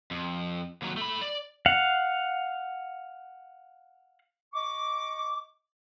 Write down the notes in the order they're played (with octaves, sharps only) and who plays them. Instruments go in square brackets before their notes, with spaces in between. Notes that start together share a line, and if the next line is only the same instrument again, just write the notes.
[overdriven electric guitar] F2
D#2 F#3
A3 B5
D5
[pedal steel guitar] F5 F#5
[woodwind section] D#5 C#6 D6